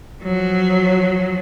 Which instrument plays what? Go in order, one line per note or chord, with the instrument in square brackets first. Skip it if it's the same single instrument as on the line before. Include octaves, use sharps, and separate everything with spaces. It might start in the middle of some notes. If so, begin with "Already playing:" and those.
[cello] F3 F#3